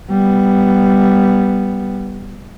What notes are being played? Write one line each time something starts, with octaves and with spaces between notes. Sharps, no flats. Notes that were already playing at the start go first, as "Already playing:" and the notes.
G3 B3